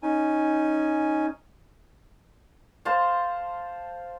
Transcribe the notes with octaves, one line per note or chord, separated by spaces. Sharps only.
C#4 D#4 G#5
C5 F5 A5 C6